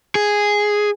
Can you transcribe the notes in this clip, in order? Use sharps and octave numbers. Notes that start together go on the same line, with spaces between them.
G#4